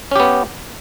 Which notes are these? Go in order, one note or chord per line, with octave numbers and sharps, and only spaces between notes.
B3 C#4 G4